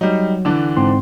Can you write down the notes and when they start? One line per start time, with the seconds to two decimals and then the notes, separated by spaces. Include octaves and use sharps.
0.01 F#3 G3 D#4
0.45 D3 E3 D4
0.77 G#2 C4 C6